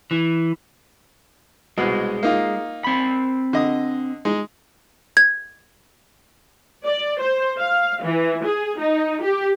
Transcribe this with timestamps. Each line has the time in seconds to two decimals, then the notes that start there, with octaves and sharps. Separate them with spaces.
0.11 E3
1.78 C2 B2 G#3
2.23 A#3 D#4 F4
2.84 C4 B5
3.53 D3 D#5 D#6
4.25 G#3 D#4
5.17 G#6
6.86 D5
7.20 C5
7.59 F5
8.03 E3
8.44 G#4
8.80 D#4
9.23 G4